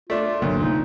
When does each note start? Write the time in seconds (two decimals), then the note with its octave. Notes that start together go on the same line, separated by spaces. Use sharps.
0.10 A3 D4 F4
0.42 G#1 D2 F#3 A#3
0.61 C3 D#3 A3 D#4